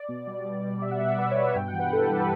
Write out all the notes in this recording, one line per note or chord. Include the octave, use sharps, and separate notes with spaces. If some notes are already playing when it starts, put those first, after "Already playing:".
Already playing: D5
B2
G3
G3
B2
B2 E5
F#5
G3 E5
D5
G3 B4
C#5
B2
E5
G2 G5
F#5
E3
B4
G2 A4
G4
G3
B4